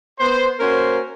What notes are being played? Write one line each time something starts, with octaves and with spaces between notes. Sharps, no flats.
B3 C5
A#3 C#4 F#4 A#4 C5